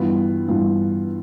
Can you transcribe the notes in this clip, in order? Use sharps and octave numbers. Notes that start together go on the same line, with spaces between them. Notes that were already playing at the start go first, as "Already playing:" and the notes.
Already playing: G2 E3 B3 F4
G2 E3 B3 F4